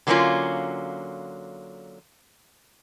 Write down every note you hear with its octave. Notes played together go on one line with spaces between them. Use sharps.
D3 F#3 A#3 C4 C#4 F4